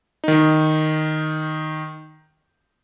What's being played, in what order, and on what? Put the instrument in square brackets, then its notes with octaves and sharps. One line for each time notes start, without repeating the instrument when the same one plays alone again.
[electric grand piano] D#3 D#4